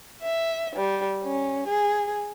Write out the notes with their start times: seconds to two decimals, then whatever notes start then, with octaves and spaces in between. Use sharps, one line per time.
0.22 E5
0.75 G3
1.23 C#4
1.67 G#4